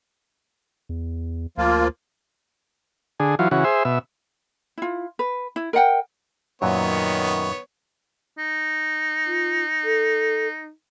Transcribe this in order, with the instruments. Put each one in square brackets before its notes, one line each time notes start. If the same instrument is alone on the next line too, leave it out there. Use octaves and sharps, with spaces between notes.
[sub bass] E2
[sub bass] D2 [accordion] F3 A#3 F4
[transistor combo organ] D3 G#4
E3 F#3 F4
C#3 E3 F#4
G#4 C5 E5
B2 E5
[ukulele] E4 F4
B4
E4
A#4 D#5 F#5 G5
[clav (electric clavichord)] F#2 A#2 F#3 [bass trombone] D#3 [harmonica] B3 C#5
[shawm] D#4
[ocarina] F4
A4